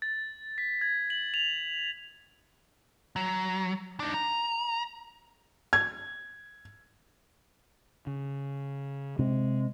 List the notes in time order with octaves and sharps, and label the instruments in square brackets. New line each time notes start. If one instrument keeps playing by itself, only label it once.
[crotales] A6
B6
G#6
F#7
F7
[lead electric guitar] F#3
D4 D#4
A#5
[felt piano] G#6
[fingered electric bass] C#3
[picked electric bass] C3 [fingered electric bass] G#3